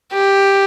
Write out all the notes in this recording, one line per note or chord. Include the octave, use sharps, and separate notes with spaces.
G4